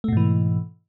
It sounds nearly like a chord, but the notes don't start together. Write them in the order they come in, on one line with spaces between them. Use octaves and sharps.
A3 B2 G#2 E3